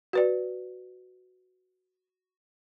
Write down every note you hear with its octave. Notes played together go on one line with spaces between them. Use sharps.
F#4 B4 D5